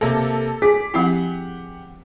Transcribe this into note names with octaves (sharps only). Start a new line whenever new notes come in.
C3 A#3 A4
G#4 D6 B6
F3 C4 E4 G4 F#5